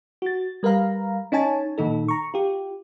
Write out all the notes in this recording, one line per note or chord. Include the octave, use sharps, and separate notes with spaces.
F#4 A6
G3 A#4 B4 F5 A#5
C#4 D#4 C#5 G#5 A5
A#2 D#3 D#4 A4
A#5 C#6
F4 G4